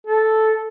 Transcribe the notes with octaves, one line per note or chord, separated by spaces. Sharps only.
A4